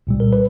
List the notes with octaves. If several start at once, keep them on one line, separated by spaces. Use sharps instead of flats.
C2 A#2 G3
A#4
B4